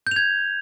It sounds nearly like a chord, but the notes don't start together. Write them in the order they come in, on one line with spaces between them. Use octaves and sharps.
G6 F7 G#6